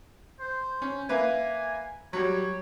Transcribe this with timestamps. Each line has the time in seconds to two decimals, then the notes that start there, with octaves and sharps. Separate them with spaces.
0.40 C5
0.82 C#4
1.09 A#3 E4 B4 G#5
2.13 F#3 G3 C#5